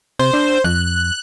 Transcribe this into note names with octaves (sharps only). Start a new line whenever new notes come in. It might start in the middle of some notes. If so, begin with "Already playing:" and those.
C3 C5
D4
F2 F#6